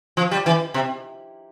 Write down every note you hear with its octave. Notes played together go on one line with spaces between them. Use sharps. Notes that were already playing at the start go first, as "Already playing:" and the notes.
F3
G3
E3
C3